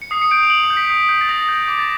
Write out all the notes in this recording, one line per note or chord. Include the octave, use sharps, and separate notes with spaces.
C#7
D#6 C7
C#7
G6 D7
F7
D#6 F#7
C7
G6
B6
D#6 C7
G6
A6
D#6 A#6
G6
D6 A#6
A6